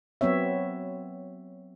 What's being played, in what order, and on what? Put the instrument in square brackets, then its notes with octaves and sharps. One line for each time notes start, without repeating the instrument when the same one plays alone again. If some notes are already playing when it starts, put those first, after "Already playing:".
[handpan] F#3 B3 C4 C#5 E5